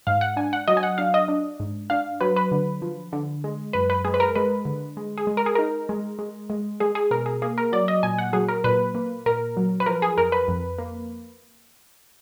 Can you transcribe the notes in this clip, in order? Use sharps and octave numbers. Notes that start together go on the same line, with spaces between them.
G#2 F5
F#5
D4 G#5
F#5
F#3 D#5
G#5
F#5
D4 F5
D#5
D4
G#2
D4 F5
F#3 B4
B4
D3
F3
D3
G#3
F#2 B4
B4
G#3 G#4
B4
A#4
G#3 B4
D3
G#3
G#4
G#3
A#4
G#4
D#4 A#4
G#3
G#3
G#3
G#3 G#4
G#4
B2 A#4
G#4
A#3 G#4
A#4
F#3 D5
D#5
A#2 G#5
F#5
F#3 G#4
A#4
A#2 B4
A#3
A#2 A#4
F#3
B4
F3 A#4
G#4
F2 A#4
B4
F2
A#3